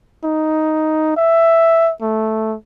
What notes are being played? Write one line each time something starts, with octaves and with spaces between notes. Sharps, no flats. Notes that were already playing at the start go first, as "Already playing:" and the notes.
D#4
E5
A3